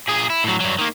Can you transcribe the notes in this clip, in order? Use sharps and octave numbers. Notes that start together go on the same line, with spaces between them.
A#2 G#4
E4
A2 F#3
G2 F#3
D#3 A#3